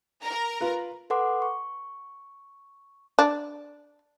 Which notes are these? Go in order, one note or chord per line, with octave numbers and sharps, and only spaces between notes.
A#4 A#5
F4 B4
A4 B4 F#5 C6 D6
C#6
D4